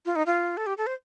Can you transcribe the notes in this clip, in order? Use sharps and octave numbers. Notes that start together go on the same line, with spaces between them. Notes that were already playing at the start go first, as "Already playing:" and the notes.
F4
D#4
F4
A4
G4
A4
C5